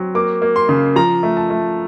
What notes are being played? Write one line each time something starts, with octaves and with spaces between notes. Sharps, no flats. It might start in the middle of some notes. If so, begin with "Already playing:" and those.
Already playing: F#3 C4
A#3 D6
A#3
C6
C#3
F3 A#5
A3
A5
A3